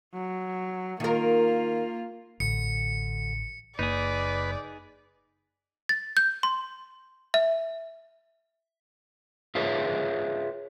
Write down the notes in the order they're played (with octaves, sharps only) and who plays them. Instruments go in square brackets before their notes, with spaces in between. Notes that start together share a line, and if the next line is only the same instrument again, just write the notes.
[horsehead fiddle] F#3
[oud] D#3 A#4 [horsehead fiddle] A#3 F4
[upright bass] A1 [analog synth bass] D3 [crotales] C#7
[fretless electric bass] F#1 A#3 [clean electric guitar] D#4 G#4 [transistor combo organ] B4 [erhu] D5
[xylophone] A6
G6
C6
E5
[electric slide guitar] F4 G#4 B4 C#5 E5 F5